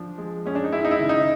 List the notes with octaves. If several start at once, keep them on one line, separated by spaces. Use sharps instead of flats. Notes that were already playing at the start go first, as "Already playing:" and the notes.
Already playing: F3 D4
G#3
G#3 C#4
D4
D#4
G#3 E4
D#4
E4
C#3
D#4